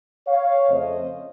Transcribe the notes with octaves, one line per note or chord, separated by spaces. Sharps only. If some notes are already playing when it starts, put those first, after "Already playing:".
C#5 F5
F2 C#3 A3 C4 C5 D#5